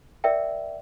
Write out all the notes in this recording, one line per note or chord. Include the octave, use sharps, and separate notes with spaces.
A#4 D5 E5 G5